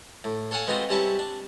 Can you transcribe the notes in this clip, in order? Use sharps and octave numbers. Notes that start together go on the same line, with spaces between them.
A2
A4 C#5 F5 F#5 G#5 A5
G#3 B3 C4 D#4 F4 F#4
C3 G3 C#4 E4 A5 C#6
D4